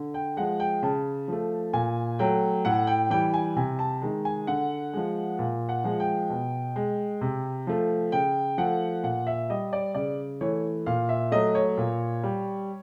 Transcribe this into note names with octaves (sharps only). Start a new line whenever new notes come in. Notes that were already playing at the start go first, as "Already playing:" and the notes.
Already playing: D3
G5
F3 G#3 F#5
G5
C#3 A5
F3 A3
A#2 G#5
F#3 A3 G5
A2 F#5
G5
E3 G3 G5
G#5
C3 G#5
A5
D#3 G#3
G#5
D3 F#5
F3 G#3
A#2
F#5
F3 G#3
G5
B2
G#3
C3
F3 A3
C#3 G5
F3 A3 F#5
A#2 F#5
E5
G3 D#5
D5
C#3 D5
E3 A3 C#5
A#2 F5
E5
F#3 A3 D#5
C#5
A#2
G3